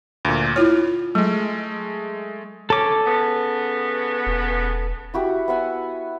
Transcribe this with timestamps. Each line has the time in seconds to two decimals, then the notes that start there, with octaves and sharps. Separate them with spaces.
0.25 D2 A#2
0.56 E4 F4 C#5 F6
1.15 F#3 G#3 A3
2.70 C#4 A4 D6
3.06 C#3 B3
4.27 E1
5.14 E4 F#4 G4 B4
5.48 B3 E5 F#5 G#5